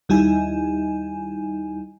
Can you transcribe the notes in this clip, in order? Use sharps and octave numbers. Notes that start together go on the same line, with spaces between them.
D#2 G3 D#4 E4 G#5